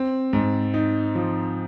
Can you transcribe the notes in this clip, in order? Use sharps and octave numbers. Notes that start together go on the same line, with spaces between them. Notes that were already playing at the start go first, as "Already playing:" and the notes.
Already playing: C4
G#2
D#4
F3